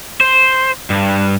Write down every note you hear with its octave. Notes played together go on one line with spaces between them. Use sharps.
C5
G2